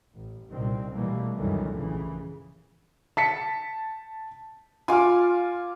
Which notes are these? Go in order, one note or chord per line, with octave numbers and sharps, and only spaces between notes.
A1
C2 A#2 D#3 C4
B2 E3 G3 A3 A#3
C#2 F#2 D#3 E3 G3 A3
A#1 C#3 E3
A5 B6 C#7
F4 G#5 D6 F6